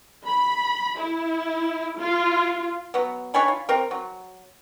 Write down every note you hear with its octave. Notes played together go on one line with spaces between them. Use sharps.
B5
E4
F4
F#3 B3
D4 C#5 G#5 B5
F4
C4 A#4
F#3